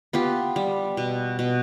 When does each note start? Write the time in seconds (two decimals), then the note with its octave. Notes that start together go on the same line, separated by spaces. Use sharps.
0.13 B3 F4 G4
0.56 G3
0.97 B2
1.39 B2